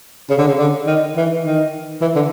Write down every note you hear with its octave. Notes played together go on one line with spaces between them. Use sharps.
C#3
D3
C#3
D3
D#3
E3
D#3
E3
D3